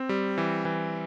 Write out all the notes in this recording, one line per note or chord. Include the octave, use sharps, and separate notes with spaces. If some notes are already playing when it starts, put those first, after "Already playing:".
Already playing: C4
G3
E3
E3